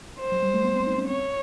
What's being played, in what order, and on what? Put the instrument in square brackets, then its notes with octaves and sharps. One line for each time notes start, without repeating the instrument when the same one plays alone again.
[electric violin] C5
[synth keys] F#3
G3
A3
B3
C4
D#4
C#4
[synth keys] C4 [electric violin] C#5